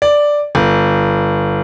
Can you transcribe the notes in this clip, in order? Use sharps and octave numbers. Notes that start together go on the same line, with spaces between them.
D5
G1